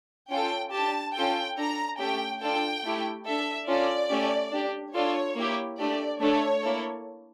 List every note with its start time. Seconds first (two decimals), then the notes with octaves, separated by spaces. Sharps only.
0.31 C#4 F4 A4 G5
0.73 G4 A5
0.78 D4
1.15 C#4 F4 A4 G5
1.57 D4 A4 A#5
1.99 A3 C#4 G4 G5
2.42 D4 F4 A4 G5
2.84 A3 E4 G4
3.26 D4 A4 E5
3.68 C#4 F4 A4 D5
4.11 A3 C#4 G4
4.52 D4 G4
4.94 D4 F4 A4 C#5
5.36 A#3 E4 G4
5.78 A3 D4 G4 D5
6.21 A3 D4 A4 C#5
6.63 A#3 E4 A4